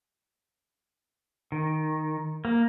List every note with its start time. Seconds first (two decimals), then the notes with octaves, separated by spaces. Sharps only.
1.52 D#3
2.45 A#3